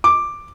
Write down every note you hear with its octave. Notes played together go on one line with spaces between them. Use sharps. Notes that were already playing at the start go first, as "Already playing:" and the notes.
D6